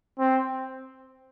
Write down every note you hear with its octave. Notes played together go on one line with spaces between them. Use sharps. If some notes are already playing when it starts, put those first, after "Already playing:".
C4